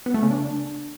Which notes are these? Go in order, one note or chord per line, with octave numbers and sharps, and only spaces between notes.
B3
A3
C#3
D4